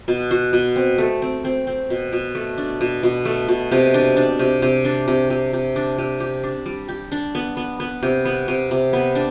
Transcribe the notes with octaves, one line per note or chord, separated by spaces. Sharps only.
B2
F#4
B2
C4
A3
C4
C4
C4
B2
B2
A3
D4
B2
B2
A3
B2
C3
D4
D4
C3
C3
D4
C3
C3
C3
D4
C3
G4
D4
G3
G4
D4
B3
B3
B3
C3
B3
C3
C3
B3
D4